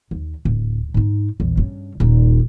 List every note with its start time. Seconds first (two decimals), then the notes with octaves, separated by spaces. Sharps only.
0.11 D#2
0.45 D1
0.94 G#2 D#4
1.40 A#1 E2
1.57 G2 C#3
2.00 D#1 D#4